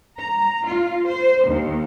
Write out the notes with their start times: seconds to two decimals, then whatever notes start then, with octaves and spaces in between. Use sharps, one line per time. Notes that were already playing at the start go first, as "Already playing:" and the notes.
0.20 A#5
0.66 F4
1.08 C5
1.47 D#2